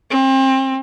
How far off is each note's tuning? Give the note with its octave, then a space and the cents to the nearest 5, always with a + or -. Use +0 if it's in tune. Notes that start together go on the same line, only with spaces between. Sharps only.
C4 +30